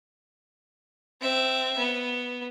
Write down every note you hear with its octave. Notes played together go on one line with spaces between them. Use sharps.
C4 E5
B3